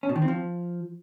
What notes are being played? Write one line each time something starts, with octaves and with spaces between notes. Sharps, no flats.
C#4
B2
D#3
C4
F3